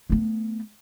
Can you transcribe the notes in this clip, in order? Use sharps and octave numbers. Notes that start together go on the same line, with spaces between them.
A3 B3